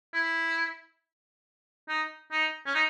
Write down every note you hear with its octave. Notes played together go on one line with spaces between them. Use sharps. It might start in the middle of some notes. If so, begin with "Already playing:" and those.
E4
D#4
D#4
C#4
D#4